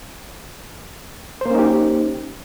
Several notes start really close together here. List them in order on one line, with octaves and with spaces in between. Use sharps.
C5 A#3 C#4 D#4 G4